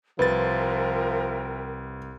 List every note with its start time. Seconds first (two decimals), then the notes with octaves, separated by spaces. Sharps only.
0.19 C2 F3 A#4 B4 E5 G5 A6